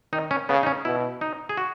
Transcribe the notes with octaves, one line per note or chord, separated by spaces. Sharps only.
D#3 D#4
C#4
C#3 B3
D#4
C#4
B2 E4
D#4
G#4
F#4